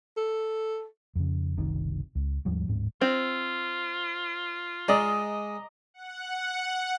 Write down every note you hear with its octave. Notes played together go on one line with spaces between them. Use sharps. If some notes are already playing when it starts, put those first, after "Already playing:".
A4
F2 C#3
F#1 C2 C3 D#3
C#2
D#2 G#2 F3 G3
D1 G#2 C4
C4 F4
G#3 D5 D#5 A#5 D6
F#5